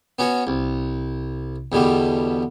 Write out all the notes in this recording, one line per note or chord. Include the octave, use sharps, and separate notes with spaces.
B3 C#4 F#4
C2
E2 B2 D3 G3